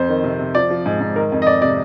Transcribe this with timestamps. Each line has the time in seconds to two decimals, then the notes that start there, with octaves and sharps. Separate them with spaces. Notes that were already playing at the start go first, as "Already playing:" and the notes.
Already playing: F2 C5
0.08 D#3
0.24 C3
0.39 C3
0.55 F3 D5
0.70 F3
0.86 G#2
1.01 G#2
1.16 D#3 A#4
1.32 F2
1.42 D#5
1.47 F2 D5
1.62 C3 D5